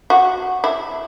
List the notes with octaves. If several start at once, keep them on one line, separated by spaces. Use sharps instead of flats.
F#4
E4